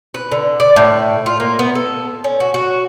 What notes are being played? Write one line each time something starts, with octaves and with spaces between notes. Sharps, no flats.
B4
D3
D5
A2
F4
A#3
B3
A4
C#4
F#4
F#4